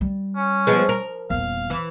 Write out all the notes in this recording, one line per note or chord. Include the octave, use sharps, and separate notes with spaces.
G3
C#4
F3 G#3 B3
A#4
D#1 E2 F5
E3